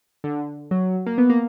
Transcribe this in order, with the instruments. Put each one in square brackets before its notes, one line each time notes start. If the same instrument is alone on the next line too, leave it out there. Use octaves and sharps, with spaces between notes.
[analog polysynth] D3
F#3
A#3
B3
A#3